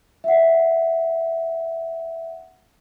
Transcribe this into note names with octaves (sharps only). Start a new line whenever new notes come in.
E5 F#5